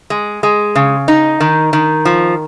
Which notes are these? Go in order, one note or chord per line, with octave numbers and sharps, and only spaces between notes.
G#3
G#3
C#3
D#4
D#3
D#3
F3